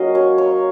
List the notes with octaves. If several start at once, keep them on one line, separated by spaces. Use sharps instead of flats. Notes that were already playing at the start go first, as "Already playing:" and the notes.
Already playing: F#3 A#3 C#4 D#5 F5
C#5
C#5